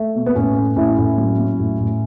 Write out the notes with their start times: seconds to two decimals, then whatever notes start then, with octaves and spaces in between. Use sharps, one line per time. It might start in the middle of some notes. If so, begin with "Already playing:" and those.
Already playing: A3
0.15 B2
0.26 B3
0.35 A2 C#4
0.57 A3
0.76 A2 C#4 E4
0.98 A2
1.17 F#3
1.39 F#3
1.59 A2
1.79 A2